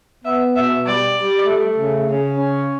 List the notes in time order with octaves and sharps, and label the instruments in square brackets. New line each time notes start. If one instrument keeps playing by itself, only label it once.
[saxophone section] B3 [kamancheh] E5
[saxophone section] B2 [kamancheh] E5
[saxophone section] G3 [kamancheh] D5
[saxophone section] G3
A3
C#3
C#3
C#4